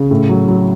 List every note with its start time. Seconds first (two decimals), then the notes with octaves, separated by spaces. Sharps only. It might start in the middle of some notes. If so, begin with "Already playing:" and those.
Already playing: C#3
0.11 A2
0.29 F#3
0.48 F#3